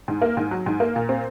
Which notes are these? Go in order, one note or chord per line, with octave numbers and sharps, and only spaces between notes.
G#2
A#3
G#2
F#3
G#2
A#3
A#2
C4